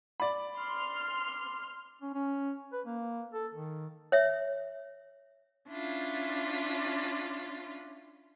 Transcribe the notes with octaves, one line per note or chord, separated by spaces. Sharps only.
D5 B5
C6 F6
C#4
C#4
B4
A#3
A4
D#3
C#5 E5
C#4 D4 E4 F4